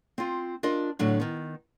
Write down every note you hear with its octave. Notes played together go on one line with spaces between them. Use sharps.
C4 F4
D4 F4 A#4 D#5
A2 D3 F#3 D4
D#3 B3